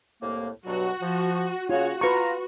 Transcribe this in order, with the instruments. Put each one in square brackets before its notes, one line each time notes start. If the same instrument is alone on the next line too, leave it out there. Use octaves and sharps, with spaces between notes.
[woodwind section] C2 A2 A#3
[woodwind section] G2 B2 F#3 [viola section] F#4
[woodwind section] F3
[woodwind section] C#3 C#5 [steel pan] F4 [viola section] F#4
[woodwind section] F4 A#5 [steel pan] B4 C#6